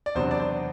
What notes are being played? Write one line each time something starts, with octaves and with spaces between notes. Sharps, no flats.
D5
E2 C3 F#3 B3 D4 C5
D5
C5